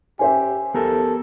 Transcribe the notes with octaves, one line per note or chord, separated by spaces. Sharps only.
C#4 G4 C5 E5 G#5
B3 G4 A4 A#4